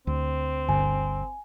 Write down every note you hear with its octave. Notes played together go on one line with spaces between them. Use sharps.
D2 C4
G1 G#5